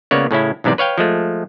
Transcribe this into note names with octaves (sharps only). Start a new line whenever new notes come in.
C#2 C#3 A#3 B3 C#5 D5
A2 C#3 C#4 E4
B1 G#2 C3 E3 D5
B4 C#5 F5 G5
F3 G#3 A3